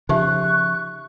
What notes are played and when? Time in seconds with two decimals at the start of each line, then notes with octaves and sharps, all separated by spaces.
0.09 C#3 F3 D#4 G4 E5 C#6 F#6